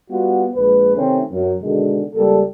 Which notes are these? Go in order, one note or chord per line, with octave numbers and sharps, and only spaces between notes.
G3 B3 F4 F#4
A#1 G#3 B4
C3 D#3 A3 C4 C#4
F#2
B2 D3 D#3 G#3
C#2 G3 A#3 A4